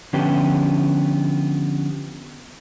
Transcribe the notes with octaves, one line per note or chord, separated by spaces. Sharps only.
D3 F3 B3 C#4 G4